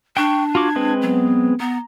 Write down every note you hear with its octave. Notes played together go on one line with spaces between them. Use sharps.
D4 G5 C#6
F4 F#4 D6 G#6
G#3 C4 B4
F#3 B3
B3 A#5